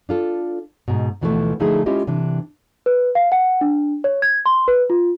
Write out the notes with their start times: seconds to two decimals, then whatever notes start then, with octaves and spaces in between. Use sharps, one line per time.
0.09 D4 F4 A4
0.88 G#2 B2
1.21 D2 B2 E3 F3 G3 A3
1.60 D3 F3 A3 D#4 E4 G#4
1.86 G#3 C#4 E4 F4 G4 D#5
2.07 C3 E3 D4
2.86 B4
3.15 F5
3.32 F#5
3.61 D4
4.04 C#5
4.22 G#6
4.46 C6
4.68 B4
4.90 F4